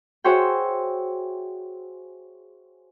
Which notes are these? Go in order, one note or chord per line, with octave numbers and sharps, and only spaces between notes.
F#4 G#4 C5 C#5 E5 G5